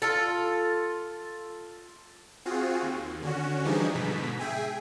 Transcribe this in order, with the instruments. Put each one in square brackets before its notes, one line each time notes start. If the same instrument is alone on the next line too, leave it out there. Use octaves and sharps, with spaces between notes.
[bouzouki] F4 A4
[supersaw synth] C4 F4 F#4 G#4
D#2
D3 C#4 F#4
E3 F3 G3 D4 D#4 G#4
G#2 B2 D3 B6
G#4 E5 G5 G#5